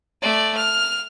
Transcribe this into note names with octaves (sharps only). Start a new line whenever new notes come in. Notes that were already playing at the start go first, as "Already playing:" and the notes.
A3 D5
F6